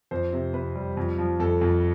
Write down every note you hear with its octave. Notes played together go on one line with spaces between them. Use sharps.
F2 C5
C3
C3 B4
G3
F2
F3
F2 A4
F2